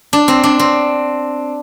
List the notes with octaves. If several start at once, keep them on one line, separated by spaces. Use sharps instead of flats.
D4
C4
D4
C4